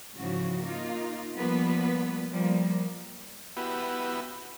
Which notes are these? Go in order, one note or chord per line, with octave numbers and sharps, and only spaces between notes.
G#2 C#3 E3 F3 F#4
A#3 D#4 F4
F3 G3 A#3 B3 B4
F3 G3 A#3
B3 E4 F#4 G4 B4